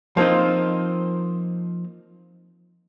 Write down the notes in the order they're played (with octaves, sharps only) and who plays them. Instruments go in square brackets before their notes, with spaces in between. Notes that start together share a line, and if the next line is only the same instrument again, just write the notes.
[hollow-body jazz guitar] F3 A#3 C4 D#4 F4